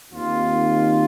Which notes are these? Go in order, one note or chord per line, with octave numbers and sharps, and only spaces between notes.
D#2 D#3 C4 F4